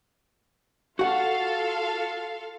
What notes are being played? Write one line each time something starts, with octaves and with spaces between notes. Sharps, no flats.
F4 F#4 A4 F5 F#5